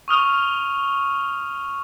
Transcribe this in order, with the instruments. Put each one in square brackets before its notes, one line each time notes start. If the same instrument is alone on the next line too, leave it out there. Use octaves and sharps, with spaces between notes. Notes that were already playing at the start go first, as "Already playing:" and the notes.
[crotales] C#6 D#6 F6 F7